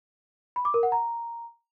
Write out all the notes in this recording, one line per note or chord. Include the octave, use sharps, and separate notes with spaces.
B5
D6
A#4
F#5
A#5